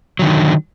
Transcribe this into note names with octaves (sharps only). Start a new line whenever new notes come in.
D3 D#3 F#3